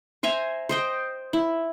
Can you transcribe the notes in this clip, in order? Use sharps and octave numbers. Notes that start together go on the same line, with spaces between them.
C5 E5 G#5 A#5
C5 D#5 G5
E4